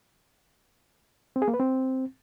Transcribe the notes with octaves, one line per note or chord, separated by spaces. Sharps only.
C4
G#4
A#3
B4
C4